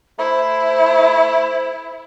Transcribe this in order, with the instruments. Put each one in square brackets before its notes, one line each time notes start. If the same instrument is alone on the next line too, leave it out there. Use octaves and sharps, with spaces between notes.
[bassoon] A3 [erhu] E4 [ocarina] C5